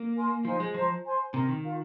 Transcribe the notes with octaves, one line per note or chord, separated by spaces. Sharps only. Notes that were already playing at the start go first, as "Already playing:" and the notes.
Already playing: A#3
A#4 G#5 C6
F3 D#4 C5 F5 G#5
G#3
F3 C5 D#5 A#5
C5 G#5 C6
C3 A#4 D#5 A#5
D#3
F4 A#4 F5